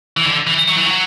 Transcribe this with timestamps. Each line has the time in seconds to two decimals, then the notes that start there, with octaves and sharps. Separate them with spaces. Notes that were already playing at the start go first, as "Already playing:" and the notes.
0.17 E3
0.27 D3
0.47 E3
0.68 F#3
0.77 E3
0.87 F#3